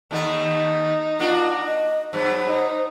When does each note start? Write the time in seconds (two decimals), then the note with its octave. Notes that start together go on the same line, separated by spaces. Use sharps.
0.11 D#2 A3 B3 D#4
1.19 A#3 D4 F4 F#4
1.66 D#5
2.13 G2 F#3 B3 C5
2.47 D#4